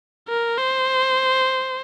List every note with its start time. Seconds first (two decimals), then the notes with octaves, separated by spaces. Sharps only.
0.29 A#4
0.58 C5